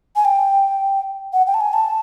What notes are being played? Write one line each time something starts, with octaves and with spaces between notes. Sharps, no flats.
G#5
G5
F#5
G5
A5
G#5
A5